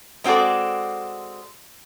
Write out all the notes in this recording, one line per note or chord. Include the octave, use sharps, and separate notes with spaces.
G#3 C4 F#4 A4 D5